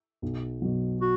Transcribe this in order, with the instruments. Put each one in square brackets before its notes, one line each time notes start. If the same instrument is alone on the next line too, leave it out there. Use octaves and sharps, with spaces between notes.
[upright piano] B1
B2 F#3
[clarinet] F#4